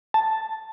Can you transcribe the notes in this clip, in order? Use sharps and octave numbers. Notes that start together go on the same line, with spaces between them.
A5